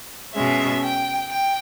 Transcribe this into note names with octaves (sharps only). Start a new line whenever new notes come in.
B2 G#3 C#4 E5
G5
G5